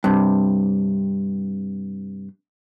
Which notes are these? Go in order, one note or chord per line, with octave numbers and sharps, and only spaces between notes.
G2 C3